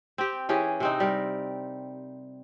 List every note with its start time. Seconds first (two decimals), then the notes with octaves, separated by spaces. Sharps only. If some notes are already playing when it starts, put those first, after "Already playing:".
0.18 C4 G4
0.49 E3 C#4 G4 G#4
0.80 C3 C4 D#4
1.00 G3 A#4